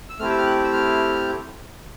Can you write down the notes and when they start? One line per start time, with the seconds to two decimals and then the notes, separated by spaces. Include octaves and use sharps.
0.10 E6
0.19 A3 C4 E4 G4 F6
0.30 E6
0.38 F6
0.46 F#6
0.64 E6
0.73 F6